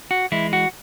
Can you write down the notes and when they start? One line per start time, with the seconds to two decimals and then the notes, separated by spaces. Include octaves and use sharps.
0.11 F#4
0.32 E3 G#3 E4
0.53 F#4